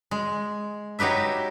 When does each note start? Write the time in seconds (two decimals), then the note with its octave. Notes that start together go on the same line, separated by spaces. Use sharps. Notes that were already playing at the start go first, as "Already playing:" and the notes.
0.11 G#3
0.99 F#3 D#4 G4 B4 E5